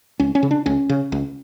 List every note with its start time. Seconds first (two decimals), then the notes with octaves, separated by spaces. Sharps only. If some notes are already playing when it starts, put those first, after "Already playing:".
0.20 C#2 C#4
0.35 C#4
0.43 C#3
0.51 D4
0.66 C#2 C#4
0.89 C#3
1.12 C#2